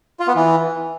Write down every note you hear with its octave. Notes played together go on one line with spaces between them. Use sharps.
F4
B3
E3